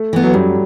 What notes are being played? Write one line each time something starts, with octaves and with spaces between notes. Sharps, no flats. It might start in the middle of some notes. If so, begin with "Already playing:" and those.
Already playing: A3
E3 B3
F#3
F#2 G3